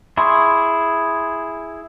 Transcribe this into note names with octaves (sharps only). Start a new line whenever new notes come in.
E4 G#4 C6 C#6